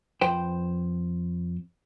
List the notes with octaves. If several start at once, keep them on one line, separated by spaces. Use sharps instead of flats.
F2 B4 C5 G5